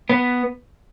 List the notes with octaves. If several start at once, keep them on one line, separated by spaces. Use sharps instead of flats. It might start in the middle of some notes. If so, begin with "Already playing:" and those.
B3